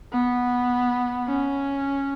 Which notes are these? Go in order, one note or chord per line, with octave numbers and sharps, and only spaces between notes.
B3
C#4